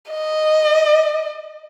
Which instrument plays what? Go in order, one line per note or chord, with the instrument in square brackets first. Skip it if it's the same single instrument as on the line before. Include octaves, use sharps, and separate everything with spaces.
[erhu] D#5